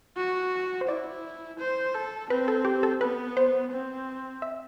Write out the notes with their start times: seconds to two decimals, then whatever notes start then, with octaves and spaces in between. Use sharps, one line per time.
0.17 F#4
0.81 C5
0.87 E4 D5
1.59 C5
1.94 A4
2.30 C4 B4
2.48 A4
2.65 G4
2.83 A4
3.01 B3 B4
3.37 C5
3.72 C4
4.42 E5